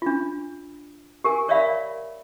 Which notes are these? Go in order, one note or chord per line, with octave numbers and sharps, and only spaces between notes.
D4 F4
G4 A#4 G#5
A#4 C#5 D5 E5 F5 B5